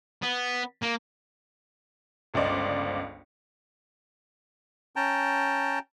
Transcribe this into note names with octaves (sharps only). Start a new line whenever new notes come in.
B3
A#3
G1 C#2 C5 D5 D#5
C#4 G5 A5 A#5